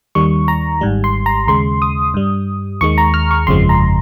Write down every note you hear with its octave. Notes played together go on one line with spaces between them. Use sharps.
D#2 D#3 G3 C#6
A#5
G#1 G#2 G3
C6
A#5
D#2 C#3 G#3 C6
D#6
G2 G3
D#2 D#3 G#3 C#6
A#5
F6
C#6
G1 F2 C#3 F3 G#3 C6
A#5